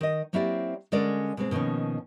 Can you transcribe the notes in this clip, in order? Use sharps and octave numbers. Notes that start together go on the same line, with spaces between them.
D#3 D#5
F#3 A#3 C4 E4 G4 D5
D3 G#3 C#4 A#4 D5
B2 G#3 C4
B2 D#3 F3 A#3 C#4